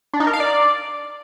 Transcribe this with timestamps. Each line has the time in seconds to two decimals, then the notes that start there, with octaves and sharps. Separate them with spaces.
0.14 D4
0.20 D#4
0.27 A#4
0.33 F5
0.40 D5